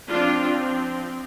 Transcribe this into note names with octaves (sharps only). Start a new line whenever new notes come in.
F3 C4 D4 F4